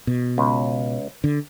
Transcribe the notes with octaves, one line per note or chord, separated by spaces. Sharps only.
B2
C#2
D3